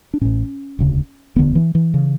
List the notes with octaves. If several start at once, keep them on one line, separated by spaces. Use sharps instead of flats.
D4
A1 A2 C#4
E1 D2 C#3
E1 D2 D3 B3
E3
E3
C#3